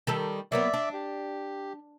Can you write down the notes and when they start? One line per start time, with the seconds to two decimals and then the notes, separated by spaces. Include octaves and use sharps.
0.07 D#3 G3 A4
0.52 F#3 A#3 B3 D5 E5
0.73 D4
0.93 G4